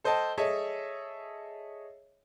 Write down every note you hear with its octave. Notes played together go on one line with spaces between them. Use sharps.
A4 C5 D#5 G5 A5
G#4 A4 C#5 D#5 E5 A5